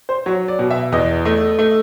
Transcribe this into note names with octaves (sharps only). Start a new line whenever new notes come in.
C5
F#3 C#5
D5
B2
E5
E2 D#5
A3
A3